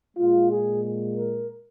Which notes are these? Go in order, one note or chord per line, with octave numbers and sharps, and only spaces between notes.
A#2 G#3 F4
G#4
A#4